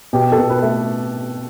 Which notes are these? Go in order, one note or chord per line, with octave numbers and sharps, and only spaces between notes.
B2 G4
A4
B2
B4
A3